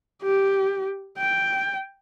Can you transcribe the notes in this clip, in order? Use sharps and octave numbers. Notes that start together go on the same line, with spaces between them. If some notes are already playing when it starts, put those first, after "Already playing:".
G4
G5